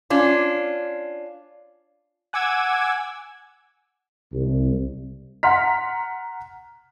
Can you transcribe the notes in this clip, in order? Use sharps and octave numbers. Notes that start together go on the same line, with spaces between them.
C#4 D4 F4
F#5 G#5 D6 E6 G#6
C2
F#5 A#5 C6 F6 B6